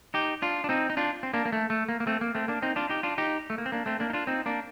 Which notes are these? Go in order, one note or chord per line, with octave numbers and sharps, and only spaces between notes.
D#4 G4
D4 F4
D4
C4 D#4
D#4
D4 F4
C4
A#3 D4
A#3
A3
A3
A#3
A#3
A3 C4
A#3
A3 C4
A#3 D4
C4 D#4
D4 F4
D#4 G4
D4 F4
D#4 G4
A3
A#3
C4
A#3 D4
A3 C4
A#3 D4
D#4
D4 F4
C4 D#4
A#3 D4